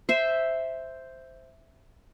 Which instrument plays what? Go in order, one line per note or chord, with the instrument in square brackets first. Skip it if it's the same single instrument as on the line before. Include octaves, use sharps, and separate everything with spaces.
[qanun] C5 E5